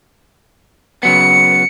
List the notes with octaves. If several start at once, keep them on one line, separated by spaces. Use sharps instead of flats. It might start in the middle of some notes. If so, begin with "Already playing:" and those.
C#3 F#3 B3 C#7